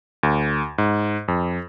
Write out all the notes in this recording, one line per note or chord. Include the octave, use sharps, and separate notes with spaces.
D2
G#2
F2